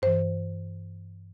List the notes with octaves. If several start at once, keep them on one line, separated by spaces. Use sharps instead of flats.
G2 E3 C5